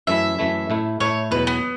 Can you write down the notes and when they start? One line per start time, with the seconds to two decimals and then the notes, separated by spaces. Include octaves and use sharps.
0.07 F#2 E3 A3 E4 E5
0.38 F#2 E3 A3 E4
0.70 A2 A3 E4
1.00 A2 A3 E4 C#5
1.31 E2 B2 F#3 B4
1.47 B3